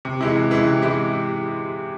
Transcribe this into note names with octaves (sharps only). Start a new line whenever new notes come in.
C3
E3 G#3 E4
C3
E3 G#3 E4
C3
E3 G#3 E4